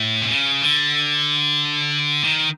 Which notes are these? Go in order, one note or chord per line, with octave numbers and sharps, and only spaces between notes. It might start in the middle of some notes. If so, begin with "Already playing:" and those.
Already playing: A2
C3
C#3
D3
D#3